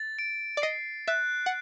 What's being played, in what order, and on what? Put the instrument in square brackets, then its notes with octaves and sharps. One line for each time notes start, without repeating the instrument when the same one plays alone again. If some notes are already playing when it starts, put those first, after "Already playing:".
Already playing: [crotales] A6
D7
[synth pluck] D5
[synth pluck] D#5 [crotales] C7
[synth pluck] E5 [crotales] F#6
[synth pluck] F#5